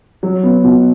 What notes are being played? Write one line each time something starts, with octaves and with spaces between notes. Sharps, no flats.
F#3
B3
B2